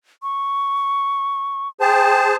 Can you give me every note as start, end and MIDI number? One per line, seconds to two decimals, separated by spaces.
0.23 1.68 85
1.81 2.36 68
1.81 2.36 72
1.81 2.27 79
1.81 2.36 81